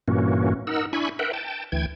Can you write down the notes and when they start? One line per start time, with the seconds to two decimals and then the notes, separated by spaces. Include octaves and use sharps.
0.08 G2 A#2 E3 A#3 C#4 F#4
0.67 D#4 A#4 F#5 E6
0.93 D4 E4 G#5 B5 C#6
1.19 A#4 B4 E5 F#5 G5
1.33 G5 A5
1.72 D2 E3 G5 G#6